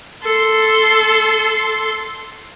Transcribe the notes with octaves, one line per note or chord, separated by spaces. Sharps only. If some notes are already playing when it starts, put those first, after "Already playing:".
A4 C6